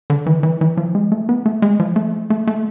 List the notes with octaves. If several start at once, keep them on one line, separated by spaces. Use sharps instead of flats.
D3
E3
E3
E3
F3
G#3
A3
B3
A3
G#3
F3
A3
A3
A3